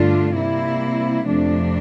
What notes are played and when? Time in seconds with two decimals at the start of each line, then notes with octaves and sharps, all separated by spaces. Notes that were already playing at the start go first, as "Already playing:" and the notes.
Already playing: G2 D3 A3 D4 F4
0.34 C3 G3 A#3 E4
1.26 F2 C3 F3 A3 D4